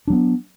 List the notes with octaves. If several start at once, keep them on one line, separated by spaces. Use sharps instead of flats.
F#3 B3 D4